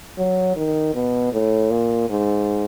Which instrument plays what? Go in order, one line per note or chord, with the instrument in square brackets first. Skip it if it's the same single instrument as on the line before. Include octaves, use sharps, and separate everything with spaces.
[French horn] F#3
D#3
B2
A2
A#2
G#2